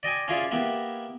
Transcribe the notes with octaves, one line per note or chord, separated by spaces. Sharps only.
D5 D#5 G5 G#5
C#4 E4 F4 G#4 D5 F5
A#3 B3 E4 G4